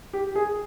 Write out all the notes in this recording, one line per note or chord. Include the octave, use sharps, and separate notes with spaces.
G4
G#4